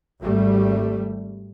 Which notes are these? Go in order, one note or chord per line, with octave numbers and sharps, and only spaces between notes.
G#1 G3 A3